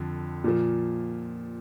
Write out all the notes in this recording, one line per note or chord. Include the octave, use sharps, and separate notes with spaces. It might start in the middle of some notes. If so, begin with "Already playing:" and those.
Already playing: F2 D3
A#2 F3